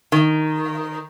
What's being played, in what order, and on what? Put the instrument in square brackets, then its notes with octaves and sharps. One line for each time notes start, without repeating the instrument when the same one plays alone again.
[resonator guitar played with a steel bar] D#3